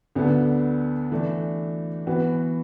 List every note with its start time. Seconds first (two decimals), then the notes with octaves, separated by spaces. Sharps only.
0.15 D2 D3 B3 D4 A4
1.12 E3 A3 D4
2.07 E3 B3 F#4 B4